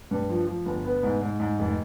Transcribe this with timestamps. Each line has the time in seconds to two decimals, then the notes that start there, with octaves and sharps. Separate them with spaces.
0.11 G2
0.30 F3
0.47 F3
0.66 G1
0.85 B3
1.03 G#2
1.21 G#2
1.40 G#2
1.59 F1